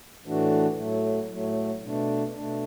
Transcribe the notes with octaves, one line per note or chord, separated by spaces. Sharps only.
A2 E3 A3 D4 F#4
A2 F#3 A3
A2 F#3 A3
B2 A3 D4
B2 A3 D4